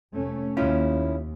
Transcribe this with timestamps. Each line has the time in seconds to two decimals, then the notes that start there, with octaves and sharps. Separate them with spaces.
0.14 F1 A3 C#4
0.57 D#2 C#4 E4 F4